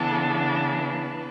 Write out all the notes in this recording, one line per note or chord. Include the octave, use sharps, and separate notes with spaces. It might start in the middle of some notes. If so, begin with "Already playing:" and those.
Already playing: C#3 E3 B3 D4 A4
B4